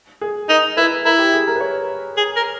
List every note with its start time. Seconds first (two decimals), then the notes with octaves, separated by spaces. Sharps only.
0.21 G#4
0.49 D#4 A#4
0.77 E4 B4
1.05 E4 A#4
1.19 G4
1.33 G#4
1.47 A#4
1.56 B4
1.60 C#5
2.17 G#4
2.36 A#4